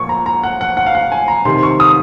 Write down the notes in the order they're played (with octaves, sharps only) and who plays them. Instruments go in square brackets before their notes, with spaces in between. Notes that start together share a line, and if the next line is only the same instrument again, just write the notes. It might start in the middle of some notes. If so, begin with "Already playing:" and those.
Already playing: [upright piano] A#2 F3 C#6
A#5
A#5
F#5
F#5
F#5
F5
F#5
G#5
A#5
C3 D#3 C6
C#6
D#6